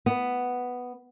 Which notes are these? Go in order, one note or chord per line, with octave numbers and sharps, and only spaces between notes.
B3